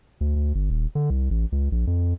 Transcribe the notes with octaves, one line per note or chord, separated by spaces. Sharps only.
D2
D2
G1
D#1
D3
C2
A1
C#2
A#1
F2